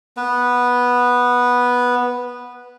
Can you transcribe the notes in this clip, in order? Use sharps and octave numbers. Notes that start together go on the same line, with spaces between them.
B3 B4